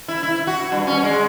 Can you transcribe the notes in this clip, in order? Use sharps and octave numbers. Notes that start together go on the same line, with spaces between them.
E4
E4
F#4
G2
C#4
G#3